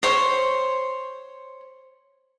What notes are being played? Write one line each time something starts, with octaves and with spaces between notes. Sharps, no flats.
C5 C#5 C6